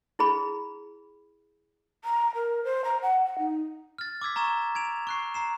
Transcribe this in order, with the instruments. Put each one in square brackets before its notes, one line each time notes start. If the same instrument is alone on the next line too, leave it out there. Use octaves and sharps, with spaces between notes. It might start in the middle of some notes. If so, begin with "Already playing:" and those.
[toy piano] E4 G#4 B5
[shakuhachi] A#5
A#4
C5
A#5
F#5
F#5
D#4
[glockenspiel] F6 A6
D6 E6 G#6 B6
A#5 C#6 G#6 E7
G#6 D7 F7
C#6 F#6 C7
A#5 C7 E7